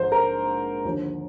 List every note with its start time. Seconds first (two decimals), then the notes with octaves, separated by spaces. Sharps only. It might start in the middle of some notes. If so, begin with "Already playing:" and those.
Already playing: A#1 G#2 F3 C5
0.12 A#4
0.84 D#2 D3 F3